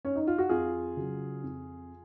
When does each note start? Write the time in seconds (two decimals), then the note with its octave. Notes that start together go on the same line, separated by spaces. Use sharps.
0.05 C#4
0.15 D#4
0.27 F4
0.38 F#4
0.49 F2 F4 G#4
0.97 C#3 F#3
1.43 F2